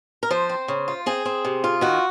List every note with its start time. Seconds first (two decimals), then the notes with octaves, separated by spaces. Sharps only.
0.23 A#4
0.31 F3 C5
0.49 C4
0.68 C#3
0.88 F4
1.06 C4 G#4
1.25 C4
1.45 C3
1.64 F4
1.81 D#3 F#4